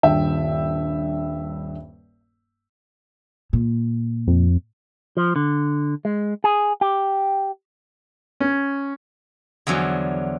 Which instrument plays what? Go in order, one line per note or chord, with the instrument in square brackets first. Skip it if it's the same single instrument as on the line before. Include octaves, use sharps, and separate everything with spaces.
[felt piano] D#1 G2 E5 G5
[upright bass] A#2
[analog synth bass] F2
[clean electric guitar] F3
D3
G#3
G#4
G4
[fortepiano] C#4
[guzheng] E2 D3 F3 F#3